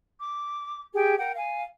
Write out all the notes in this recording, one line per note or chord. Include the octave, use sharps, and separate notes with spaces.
D6
G4 G#4 G5
A#4 F#5 G5
F5 G#5